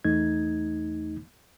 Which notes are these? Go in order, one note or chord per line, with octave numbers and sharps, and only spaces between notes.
E2 A3 D#4 G#6